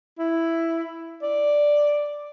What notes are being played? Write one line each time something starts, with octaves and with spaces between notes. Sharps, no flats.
E4
D5